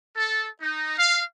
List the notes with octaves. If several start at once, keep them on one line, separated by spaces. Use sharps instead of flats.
A4
D#4
F5